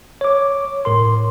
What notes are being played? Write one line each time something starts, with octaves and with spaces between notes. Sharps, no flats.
C#5 D6
A2 A#4 C6